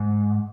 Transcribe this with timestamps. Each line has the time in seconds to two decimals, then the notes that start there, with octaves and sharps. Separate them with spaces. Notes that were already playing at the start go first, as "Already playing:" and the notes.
Already playing: G#2